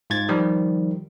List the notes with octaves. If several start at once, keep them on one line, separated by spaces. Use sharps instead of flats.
G#2 F4 G#6 A6
D#3 F3 G3